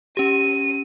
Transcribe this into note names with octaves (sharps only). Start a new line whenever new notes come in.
C#4 G4 D#7